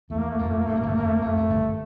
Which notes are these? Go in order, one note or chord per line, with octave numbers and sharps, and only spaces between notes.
E2 A3
A#3
A3
F2 A#3
A3
A#3
G2 A3
F2 A#3
G1 G2 A3
F2 A#3
A3
A#3
F2 A3
F2
G1 G2